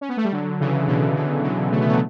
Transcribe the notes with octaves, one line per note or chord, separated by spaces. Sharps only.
C#4
B3
A3
G3
D3 F#3
C#3 E3
B2 D3
C#3 E3
D3 F#3
A3
B3
F#3 A3